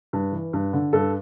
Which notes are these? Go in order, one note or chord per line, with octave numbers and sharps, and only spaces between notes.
G2
E3
G2
D3
G2 A4